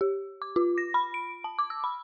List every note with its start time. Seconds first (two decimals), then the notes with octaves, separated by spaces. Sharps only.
0.01 G4
0.42 D6
0.56 F4
0.78 A#6
0.94 B5
1.14 D7
1.44 A5
1.59 D6
1.70 E6
1.84 B5